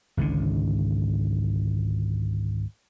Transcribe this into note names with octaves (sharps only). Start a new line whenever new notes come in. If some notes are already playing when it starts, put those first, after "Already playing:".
G#1 C#2 G#2 D3